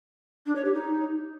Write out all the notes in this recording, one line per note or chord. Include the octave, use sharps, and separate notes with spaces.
D4
C#5
G4
D#4